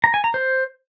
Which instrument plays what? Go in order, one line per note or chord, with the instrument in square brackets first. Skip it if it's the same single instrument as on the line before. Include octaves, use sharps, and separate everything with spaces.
[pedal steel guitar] A#5
G#5
A#5
C5